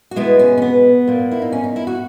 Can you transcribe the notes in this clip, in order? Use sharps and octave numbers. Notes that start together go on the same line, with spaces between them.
F#4
B2 G#3 B3 E4
C#4
C#4
B3
A#2 A#3
E4
D#4
C#4
D#4
E4
F#4